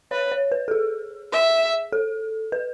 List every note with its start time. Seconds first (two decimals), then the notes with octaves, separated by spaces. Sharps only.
0.11 B4 C#5
0.32 C#5
0.52 B4
0.68 A4
0.71 G#4
1.32 E5
1.92 A4
2.52 B4